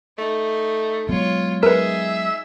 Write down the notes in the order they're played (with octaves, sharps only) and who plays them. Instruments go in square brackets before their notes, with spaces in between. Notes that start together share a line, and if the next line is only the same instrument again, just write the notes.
[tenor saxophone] A3 [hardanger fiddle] D#4
[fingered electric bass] F#3 G#3 B3 [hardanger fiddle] F4 C#5
[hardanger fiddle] D#4 G#4 [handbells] A#4 B4 [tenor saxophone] E5